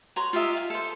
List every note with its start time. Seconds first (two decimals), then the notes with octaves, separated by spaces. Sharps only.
0.16 F#4 C#5 A#5 C6
0.33 F4 G4 D#5 E5
0.53 F5 G#5
0.70 A4 C5